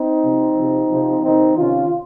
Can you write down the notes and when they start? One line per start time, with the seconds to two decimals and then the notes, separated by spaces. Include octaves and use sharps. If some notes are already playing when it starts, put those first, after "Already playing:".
Already playing: C4 D#4
0.23 C3 F3
0.57 C3 F3
0.90 C3 F3
1.23 C3 D#3 C4 D#4
1.56 C3 D#3 C#4 F4